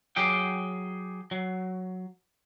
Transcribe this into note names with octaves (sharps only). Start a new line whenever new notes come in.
F#3 G4 G#4 G5
F#3